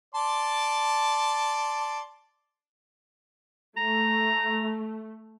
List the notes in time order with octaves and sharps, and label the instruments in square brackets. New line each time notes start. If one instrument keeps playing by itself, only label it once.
[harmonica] D5 A5 C6
[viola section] A3 [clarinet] A#5